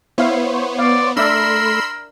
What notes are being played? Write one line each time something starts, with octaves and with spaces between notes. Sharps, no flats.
B3 E4 C5 C#5 F5
D5 F5
A3 D4 A#4 D5 E5 B5 C6 E6